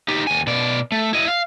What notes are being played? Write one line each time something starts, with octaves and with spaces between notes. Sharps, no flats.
D#4 G4
D#2 G#5
B2 D5
A3
E4 D#5
F5